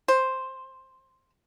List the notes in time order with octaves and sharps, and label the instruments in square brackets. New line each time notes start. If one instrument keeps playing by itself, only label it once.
[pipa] C5